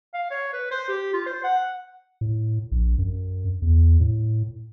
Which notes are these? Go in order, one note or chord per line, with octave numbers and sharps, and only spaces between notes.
F5
C#5
B4
C5
G4
F4
C5
F#5
A2
A#1
F#2
E2
A2